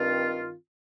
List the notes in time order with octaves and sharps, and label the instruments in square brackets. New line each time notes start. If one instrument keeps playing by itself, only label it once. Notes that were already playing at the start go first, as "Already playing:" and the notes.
Already playing: [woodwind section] G2 D#3 C4 F4